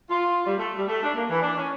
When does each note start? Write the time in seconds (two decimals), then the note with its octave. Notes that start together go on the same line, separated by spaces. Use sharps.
0.10 F4
0.46 G3
0.58 A3
0.77 G3
0.88 A3
1.02 D4
1.14 A#3
1.29 E3
1.41 D4
1.57 C#4